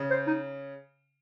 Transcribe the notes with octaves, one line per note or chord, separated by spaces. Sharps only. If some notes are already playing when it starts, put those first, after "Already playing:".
Already playing: C#3
C5
D#4